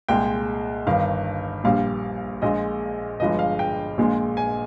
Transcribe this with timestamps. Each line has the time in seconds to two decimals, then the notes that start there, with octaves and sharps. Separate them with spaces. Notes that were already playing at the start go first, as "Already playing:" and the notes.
0.09 C2 A#2 G#3 G5
0.87 G1 G2 D#3 F5
1.64 A#1 A#2 G3 F5
2.42 A#1 A#2 G#3 D#5
3.20 G1 G2 F3 G#3 D#5
3.39 F5
3.59 G5
3.97 A#1 A#2 G#3
4.37 G#5